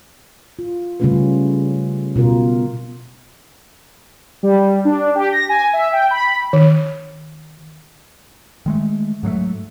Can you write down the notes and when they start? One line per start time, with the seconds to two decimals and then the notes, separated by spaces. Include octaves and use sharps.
0.59 F4
1.00 C#3 G3 A3 C#4 F4 B4
2.16 B2 F4 A#4
4.43 G3
4.85 D4
5.15 G4
5.32 A#6
5.49 G#5
5.73 E5
5.92 G5
6.11 B5
6.53 D#3
8.66 D#3 G#3 A3
9.23 G#2 F#3 G#3 A3